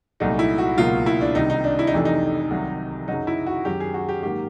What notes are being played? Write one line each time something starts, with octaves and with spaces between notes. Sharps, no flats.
C2 A#2 F#3 A3 D#4
E4
F#4
C#2 B2 F#3 A#3 F4
E4
D4
C2 C3 D#3 D#4
D#4
D4
E4
D#4
F2 C3 E3 A3 D4
D#4
C2 C3 D#3 F#3
F#2 C#3 F#3 D#4
E4
F#4
F#2 D#3 G#3 G4
G#4
F#4
G4
G#2 D#3 F#3 A#3 G4